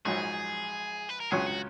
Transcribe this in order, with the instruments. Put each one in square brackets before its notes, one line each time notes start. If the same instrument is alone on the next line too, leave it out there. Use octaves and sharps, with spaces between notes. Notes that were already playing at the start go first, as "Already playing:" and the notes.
[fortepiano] A#1 G#2 F#3 [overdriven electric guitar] G#4
[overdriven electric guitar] B4
A#4
[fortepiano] C#2 C#3 F#3 C#4 [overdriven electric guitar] G#4
[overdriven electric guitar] F#4